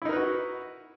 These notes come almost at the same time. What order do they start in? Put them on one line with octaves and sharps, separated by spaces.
E4 D#4 A#4 B4 F#4